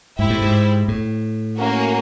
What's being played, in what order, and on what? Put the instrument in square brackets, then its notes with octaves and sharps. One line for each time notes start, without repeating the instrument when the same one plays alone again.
[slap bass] G#2 [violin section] E4 G4 C5 E5
[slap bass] A2
G#2
A2
[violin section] A#3 C#4 F#4 A#4